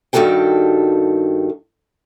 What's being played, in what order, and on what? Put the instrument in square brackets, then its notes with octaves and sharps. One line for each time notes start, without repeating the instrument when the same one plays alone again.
[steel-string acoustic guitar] G2 D#3 G3 F#4 A4 G5